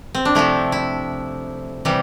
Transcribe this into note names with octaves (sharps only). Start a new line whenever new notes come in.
C4
D4
C3 F3 A3 E4
E4
C3 E3 G3